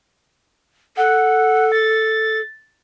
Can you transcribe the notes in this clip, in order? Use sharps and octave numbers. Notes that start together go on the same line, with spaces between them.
A4 F#5
A6